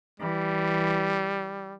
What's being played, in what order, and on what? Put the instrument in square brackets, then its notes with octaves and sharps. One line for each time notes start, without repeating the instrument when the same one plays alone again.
[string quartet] E3 [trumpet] G3